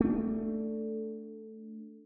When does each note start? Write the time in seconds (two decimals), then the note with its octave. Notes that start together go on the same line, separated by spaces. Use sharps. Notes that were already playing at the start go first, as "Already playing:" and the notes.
0.01 A3 D4